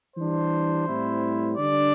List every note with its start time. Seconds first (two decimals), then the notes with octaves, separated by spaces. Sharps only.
0.16 E3 G3 D4 C5
0.87 A2 G3 C4 E4
1.58 D3 G3 D4 D5